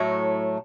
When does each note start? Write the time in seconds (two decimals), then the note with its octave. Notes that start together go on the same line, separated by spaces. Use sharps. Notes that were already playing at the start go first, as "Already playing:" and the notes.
Already playing: A2 F#3 A3